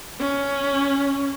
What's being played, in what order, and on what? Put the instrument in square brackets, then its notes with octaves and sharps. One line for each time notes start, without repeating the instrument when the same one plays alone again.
[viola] C#4